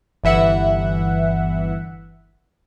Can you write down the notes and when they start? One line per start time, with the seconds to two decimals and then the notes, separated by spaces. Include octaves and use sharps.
0.24 G1 E3 E5 F#5